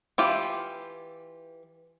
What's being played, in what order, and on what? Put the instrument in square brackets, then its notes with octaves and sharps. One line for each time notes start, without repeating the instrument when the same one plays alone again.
[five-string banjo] E3 F4 G4